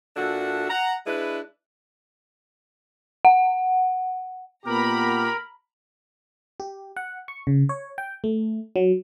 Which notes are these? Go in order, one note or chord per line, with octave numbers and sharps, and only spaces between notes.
A#2 D4 F#4 A4 E5
F#5 A#5
G#3 D4 E4 B4
F#5
A#2 B3 G4 A#4 A#5 B5
G4
F#5
C#6
C#3
C#5
G5
A3
F#3